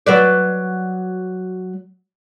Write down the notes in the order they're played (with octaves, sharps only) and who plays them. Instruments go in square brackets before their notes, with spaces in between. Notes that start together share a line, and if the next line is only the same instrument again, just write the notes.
[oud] F#3 B4 D5